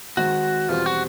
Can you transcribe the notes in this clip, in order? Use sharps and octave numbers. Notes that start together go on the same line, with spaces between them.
D#3 G#3 C4 F#4
E2 B2 G3 C4 F4
F#4